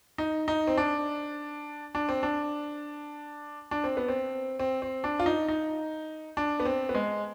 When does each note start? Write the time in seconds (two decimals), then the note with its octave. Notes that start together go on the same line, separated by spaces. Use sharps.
0.18 D#4
0.48 D#4
0.67 C4
0.77 D4
1.95 D4
2.09 C4
2.23 D4
3.71 D4
3.84 C4
3.97 B3
4.08 C4
4.59 C4
4.82 C4
5.04 D4
5.19 F4
5.26 D#4
5.48 D#4
6.37 D4
6.60 B3
6.65 C4
6.89 B3
6.95 G#3